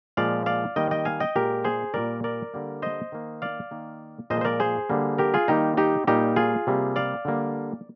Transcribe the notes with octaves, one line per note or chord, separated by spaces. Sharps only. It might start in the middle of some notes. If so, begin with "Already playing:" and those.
A#2 F3 G#3 D5 F5
D5 F5
D#3 G3 A#3 D#5 G5
D#5 G5
F5 G#5
D#5 G5
A#2 G#3 G4 A#4
G#4 C5
A#2 G3 A#3 A#4 D5
A#4 D5
D3 G3 A#3
C5 D#5
D#3 A#3
D5 F5
D#3 A#3
A#2 F3 G#3 C5 D#5
C5
A#4 D5
G#4 C5
D3 G3 A#3
G4 A#4
F4 G#4
D#3 G3 A#3 D#4 G4
D#4 G4
A#2 G3 A#3 D#4 G4
F4 G#4
C3 G3 A#3
D5 F5
D3 G3 A#3